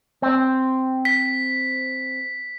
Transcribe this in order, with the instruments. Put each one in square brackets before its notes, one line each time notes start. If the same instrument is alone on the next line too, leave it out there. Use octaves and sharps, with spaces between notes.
[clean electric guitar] C4
[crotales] B6